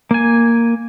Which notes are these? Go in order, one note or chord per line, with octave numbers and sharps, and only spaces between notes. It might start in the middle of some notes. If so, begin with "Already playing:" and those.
A#3 G#5